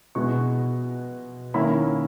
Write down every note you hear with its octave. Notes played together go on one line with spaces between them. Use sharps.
B2 G#3 B3 E4 C#6
D#3 A#3 C#4 E4 B5